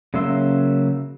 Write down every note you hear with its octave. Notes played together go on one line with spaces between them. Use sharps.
C#3 F#3 A#3 E5 C6